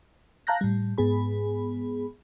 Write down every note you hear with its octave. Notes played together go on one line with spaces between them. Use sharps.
F5 A5 A#5 F#6 G6 A#6
A2 G3
G#2 B3 G#4 B5